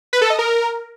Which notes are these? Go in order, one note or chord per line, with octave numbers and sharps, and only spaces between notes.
B4
A4
D#5
A#4